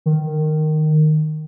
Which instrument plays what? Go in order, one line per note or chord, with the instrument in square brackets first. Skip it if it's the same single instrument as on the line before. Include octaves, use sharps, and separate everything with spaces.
[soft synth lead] D#3